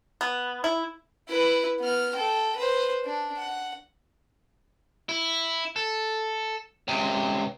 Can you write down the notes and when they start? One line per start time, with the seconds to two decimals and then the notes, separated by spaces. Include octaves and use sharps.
0.21 B3
0.64 E4
1.29 E4 B4
1.79 B3 F6
2.15 A4 G5
2.57 B4 C5
3.05 D4
3.38 F#5
5.09 E4
5.76 A4
6.88 C#2 C3